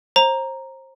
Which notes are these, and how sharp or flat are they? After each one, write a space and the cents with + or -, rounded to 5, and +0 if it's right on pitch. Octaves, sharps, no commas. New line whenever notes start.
C5 +30 A#5 +0